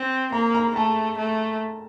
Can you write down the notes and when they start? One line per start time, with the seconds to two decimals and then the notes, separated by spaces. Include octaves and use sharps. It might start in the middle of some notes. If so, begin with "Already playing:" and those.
Already playing: C4
0.32 A#3 A#5
0.55 A#5
0.76 A3 A5
1.18 A3